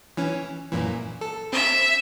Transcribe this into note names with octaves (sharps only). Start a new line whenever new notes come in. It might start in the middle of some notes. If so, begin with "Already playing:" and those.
E3 C#4
F#2 A#2 E3
A4
C4 E5